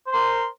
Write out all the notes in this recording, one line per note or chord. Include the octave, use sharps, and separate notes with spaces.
A#4 C5 C6